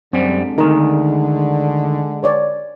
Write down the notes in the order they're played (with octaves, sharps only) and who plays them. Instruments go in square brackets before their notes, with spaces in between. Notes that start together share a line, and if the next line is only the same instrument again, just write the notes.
[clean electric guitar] F#2 G3 [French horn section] D3 G#3 [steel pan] C4
[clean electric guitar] D2 D#3 [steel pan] D#4 A#4
[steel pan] B4 C#5 D5